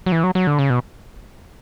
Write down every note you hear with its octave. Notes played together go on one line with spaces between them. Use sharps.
F#3
E3
F#3
F#3
D3
C#3
B2